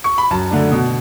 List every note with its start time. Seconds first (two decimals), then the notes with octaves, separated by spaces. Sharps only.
0.04 C#6
0.18 B5
0.31 F#2 A5
0.51 D3 A3 D4
0.71 B2